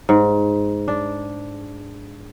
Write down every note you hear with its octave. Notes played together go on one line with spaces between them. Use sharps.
G#2
D4